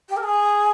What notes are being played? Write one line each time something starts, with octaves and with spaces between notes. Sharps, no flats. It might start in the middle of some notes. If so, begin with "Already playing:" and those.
G4
A#4
G#4